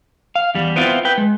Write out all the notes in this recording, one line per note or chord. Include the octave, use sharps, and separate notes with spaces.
F5
E2 G3
B3 C4 E4 F4
B4 G5
G#3